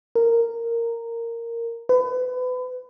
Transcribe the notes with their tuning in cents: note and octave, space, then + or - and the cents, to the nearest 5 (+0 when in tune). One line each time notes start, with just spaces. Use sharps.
A#4 -10
B4 +30